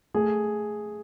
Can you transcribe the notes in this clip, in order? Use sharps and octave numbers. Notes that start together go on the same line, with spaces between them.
A3 G#4